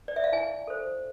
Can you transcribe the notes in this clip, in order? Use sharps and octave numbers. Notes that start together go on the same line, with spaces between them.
D5
E5
F5
E4 G#5
A4 C5